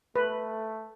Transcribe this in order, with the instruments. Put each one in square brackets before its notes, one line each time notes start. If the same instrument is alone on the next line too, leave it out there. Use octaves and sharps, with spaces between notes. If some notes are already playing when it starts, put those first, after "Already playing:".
[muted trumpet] A3 [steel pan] B4